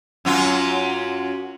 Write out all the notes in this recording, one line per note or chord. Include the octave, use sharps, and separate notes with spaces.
F#2 F#3 F4